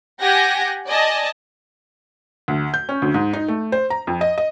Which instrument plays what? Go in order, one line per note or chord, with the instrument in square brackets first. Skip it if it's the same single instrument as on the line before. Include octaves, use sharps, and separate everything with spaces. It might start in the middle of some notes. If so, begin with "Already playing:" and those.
[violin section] G4 F#5 G#5 G6 A#6
D5 D#5 G#5 A5
[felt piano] D2
G6
C#4
D2
G#2
D#4
A3
C5
A#5
F2
D#5
D#5